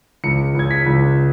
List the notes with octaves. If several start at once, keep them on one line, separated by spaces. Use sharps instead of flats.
C#2 C#7
C#2 G#6
B6
C#2